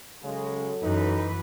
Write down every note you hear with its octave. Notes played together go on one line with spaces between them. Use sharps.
C#3 F#3 G#3 A4
F#2 E3 D#4 B4